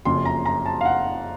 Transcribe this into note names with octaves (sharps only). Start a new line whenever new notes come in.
F#1 F2 C#3 C6
A#5
A#5
A5
F5
F#5